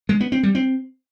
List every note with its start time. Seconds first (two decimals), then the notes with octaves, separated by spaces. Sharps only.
0.09 G#3
0.21 B3
0.32 C4
0.43 G3
0.55 C4